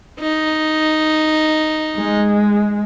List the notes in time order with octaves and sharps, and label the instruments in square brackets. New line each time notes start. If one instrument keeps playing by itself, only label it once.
[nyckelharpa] D#4
[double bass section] G#3